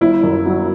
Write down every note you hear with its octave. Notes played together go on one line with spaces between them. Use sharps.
G1 E4
F#2
F#3